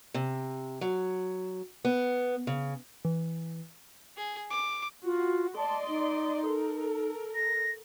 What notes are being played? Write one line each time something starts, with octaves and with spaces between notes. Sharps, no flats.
C3
F#3
B3
C#3
E3
G#4
D6
F4 F#4
D5 D#5 A5 C6
D#4
A4 A#4
A#6